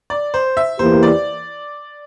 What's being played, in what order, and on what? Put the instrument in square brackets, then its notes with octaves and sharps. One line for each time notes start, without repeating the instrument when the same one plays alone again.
[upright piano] D5
C5
E5
[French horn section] E2 E3 A#3 E4 G4 [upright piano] C5
[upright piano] D5